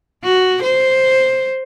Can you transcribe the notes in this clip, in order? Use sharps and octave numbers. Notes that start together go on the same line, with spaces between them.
F#4
C5